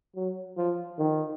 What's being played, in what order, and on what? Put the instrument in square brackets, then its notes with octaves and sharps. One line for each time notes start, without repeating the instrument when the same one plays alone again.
[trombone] F#3
F3
D#3